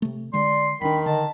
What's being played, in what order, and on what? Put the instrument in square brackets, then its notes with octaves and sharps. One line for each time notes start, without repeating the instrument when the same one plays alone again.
[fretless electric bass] C3 A3
[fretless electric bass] D3 G#3 [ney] D5 [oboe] C6
[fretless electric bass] D#1 D4 [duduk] D#3 [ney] G5 [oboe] B5
[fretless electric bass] D3 [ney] D#5 [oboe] A5